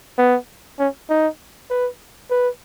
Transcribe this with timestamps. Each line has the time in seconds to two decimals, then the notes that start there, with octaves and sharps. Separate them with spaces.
0.18 B3
0.79 C#4
1.09 D#4
1.70 B4
2.30 B4